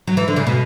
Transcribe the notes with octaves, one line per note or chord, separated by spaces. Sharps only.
F#3
E3
D3
C#3
B2